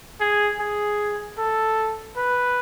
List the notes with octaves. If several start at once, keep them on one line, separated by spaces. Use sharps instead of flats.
G#4
G#4
A4
B4